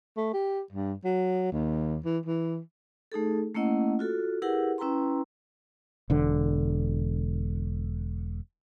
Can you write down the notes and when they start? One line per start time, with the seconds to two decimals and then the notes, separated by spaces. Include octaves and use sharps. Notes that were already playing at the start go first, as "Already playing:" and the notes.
0.17 A3
0.33 G4
0.72 G2
1.05 F#3
1.52 D#2
2.05 E3
2.26 E3
3.12 A3 D#4 G#4 A4
3.55 A3 A#3 C#4 E4 D#5 F#5
3.99 F4 F#4 A4
4.42 E4 G4 G#4 A#4 B4 F#5
4.78 C#4 E4 B4 G5 A#5 C6
6.10 E1 D3